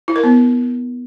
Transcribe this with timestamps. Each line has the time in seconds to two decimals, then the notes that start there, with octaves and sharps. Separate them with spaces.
0.08 E4
0.16 A#4
0.23 B3